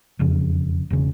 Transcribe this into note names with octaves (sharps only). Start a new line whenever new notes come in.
E1 F2 C#3
E1 C#3